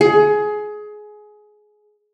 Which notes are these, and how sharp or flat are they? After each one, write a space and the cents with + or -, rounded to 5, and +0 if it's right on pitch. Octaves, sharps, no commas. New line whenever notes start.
G#4 +20